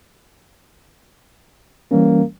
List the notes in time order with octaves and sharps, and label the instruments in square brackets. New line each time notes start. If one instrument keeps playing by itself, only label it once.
[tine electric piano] E3 G3 C#4 [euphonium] A#3